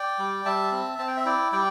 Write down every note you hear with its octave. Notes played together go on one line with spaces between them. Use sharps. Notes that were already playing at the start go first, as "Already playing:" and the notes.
Already playing: D5 G5
G3
G3 E5 A5
C4
C4 A5
G5
E5
E4 D5 G5
G3 D5 G5